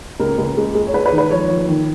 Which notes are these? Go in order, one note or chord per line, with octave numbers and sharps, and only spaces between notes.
C#2 A#4
C#2
G#3
G#3
C#5
G#3 B4
B4
D#3
B4
F3 C#5
F3
D#3